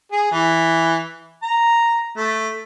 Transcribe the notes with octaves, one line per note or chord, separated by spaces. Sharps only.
G#4
E3
A#5
A3